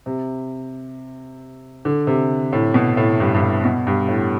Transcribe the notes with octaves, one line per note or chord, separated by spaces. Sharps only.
C3
D3
C3
A2
B2
A2
G2
G2
A2
B2
G2
A2